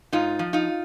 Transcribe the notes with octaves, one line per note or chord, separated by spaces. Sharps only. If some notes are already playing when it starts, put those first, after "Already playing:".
G#2 D#4 F4
F3
D#4 F4